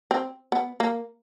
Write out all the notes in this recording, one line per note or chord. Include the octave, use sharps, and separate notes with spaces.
C4
B3
A#3